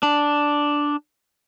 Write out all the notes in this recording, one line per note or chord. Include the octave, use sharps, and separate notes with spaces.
D4